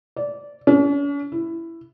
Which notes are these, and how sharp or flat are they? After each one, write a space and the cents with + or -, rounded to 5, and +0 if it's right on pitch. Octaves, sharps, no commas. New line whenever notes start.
D5 -15
C#4 +45
E4 +10